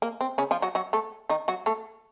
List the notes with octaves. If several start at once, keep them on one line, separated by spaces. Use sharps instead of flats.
A#3
C4
C#3 C#4
F3 F4
F#3 F#4
F#3 F#4
A3 A4
D#3 D#4
F#3 F#4
A3 A4